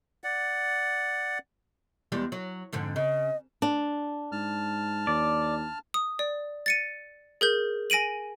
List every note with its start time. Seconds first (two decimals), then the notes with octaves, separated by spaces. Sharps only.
0.24 D5 F#5
2.12 E2 G3 G#3
2.32 F#3
2.72 F2 G#2 D3
2.96 C#3 D#5
3.62 D4
4.32 G#2 A5 F6
5.07 D#2 D5
5.94 D#6
6.19 D5
6.66 A6 C#7 D#7
7.41 G#4 A#4 G6
7.90 G#5 A#6 D7 D#7 F#7